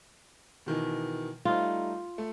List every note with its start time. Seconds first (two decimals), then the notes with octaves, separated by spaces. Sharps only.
0.66 B2 D#3 E3
1.45 G3 A3 D#4 F4
2.18 A3